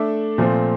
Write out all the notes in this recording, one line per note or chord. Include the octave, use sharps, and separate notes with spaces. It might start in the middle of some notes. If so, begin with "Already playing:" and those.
Already playing: A3 D4 A4 E5
A#2 F3 A3 C4